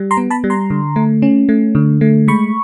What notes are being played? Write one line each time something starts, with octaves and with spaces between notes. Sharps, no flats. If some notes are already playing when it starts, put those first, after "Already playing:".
Already playing: G3
A#5 C6
B3
A5 B5
G3
A#5 C6
D3
A3
C#4
A3
D3
A3
G#3 B5 C#6